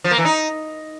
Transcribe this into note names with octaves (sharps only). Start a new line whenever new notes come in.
F3
A#3
E3
D#4